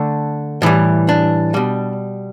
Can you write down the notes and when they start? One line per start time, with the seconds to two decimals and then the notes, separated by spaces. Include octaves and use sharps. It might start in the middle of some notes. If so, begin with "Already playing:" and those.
Already playing: D3 A3 D4
0.62 A2 E3 G3
1.09 D4
1.54 B2 G3